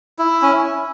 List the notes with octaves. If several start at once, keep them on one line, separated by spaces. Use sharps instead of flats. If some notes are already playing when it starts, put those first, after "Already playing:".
E4
C#4